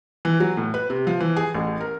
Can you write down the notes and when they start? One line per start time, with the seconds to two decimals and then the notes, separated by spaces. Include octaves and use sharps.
0.25 E3
0.40 F#3
0.57 A2
0.74 B4
0.90 C3
1.07 F3
1.20 E3
1.36 G#4
1.55 A1
1.81 A#4